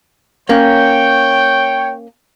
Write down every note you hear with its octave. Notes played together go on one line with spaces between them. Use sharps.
A#3 C#4 C#5 G5